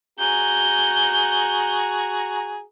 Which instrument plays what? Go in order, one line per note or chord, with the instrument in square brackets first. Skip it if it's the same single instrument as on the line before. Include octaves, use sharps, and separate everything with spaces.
[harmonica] F#4 G#4 A#5 [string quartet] G6